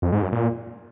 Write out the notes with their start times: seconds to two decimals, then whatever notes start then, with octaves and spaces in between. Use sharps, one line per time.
0.02 F2
0.12 G#2
0.22 F#2
0.32 A#2